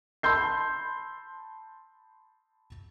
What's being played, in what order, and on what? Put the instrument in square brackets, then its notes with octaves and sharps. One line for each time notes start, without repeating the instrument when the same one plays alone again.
[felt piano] A5 B5 C6 E6 G6 C7